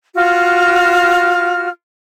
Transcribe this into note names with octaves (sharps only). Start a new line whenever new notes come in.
F4 F#4 F6